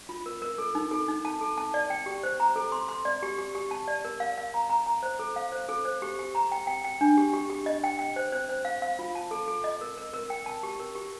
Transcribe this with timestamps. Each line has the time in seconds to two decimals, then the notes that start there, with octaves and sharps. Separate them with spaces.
0.09 F4
0.26 A#4
0.42 A#4
0.58 A4
0.75 D#4
0.91 A4
1.08 D#4
1.25 A5
1.41 A4
1.58 A5
1.74 D5
1.90 G5
2.06 G4
2.23 C5
2.40 A#5
2.56 A4
2.72 C6
2.89 C6
3.05 D5
3.23 G4
3.38 G4
3.55 G4
3.71 A5
3.88 D5
4.05 A#4
4.20 F5
4.38 F5
4.54 A#5
4.70 A#5
4.86 A#5
5.03 C5
5.19 A4
5.36 F5
5.52 C5
5.69 A4
5.85 C5
6.02 G4
6.19 G4
6.35 A#5
6.52 G5
6.67 G5
6.84 G5
7.01 D4
7.17 G4
7.33 G4
7.50 G4
7.66 D#5
7.84 G5
7.99 G5
8.16 C5
8.32 C5
8.49 C5
8.65 F5
8.82 F5
8.99 F4
9.15 A5
9.31 A4
9.48 A4
9.64 D#5
9.81 A#4
9.98 A#4
10.13 A#4
10.30 G5
10.46 A5
10.63 G4
10.80 A#4
10.95 G4